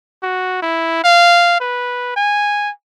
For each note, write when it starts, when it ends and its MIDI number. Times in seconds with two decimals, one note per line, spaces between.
0.23 0.62 66
0.62 1.00 64
1.04 1.59 77
1.61 2.15 71
2.16 2.71 80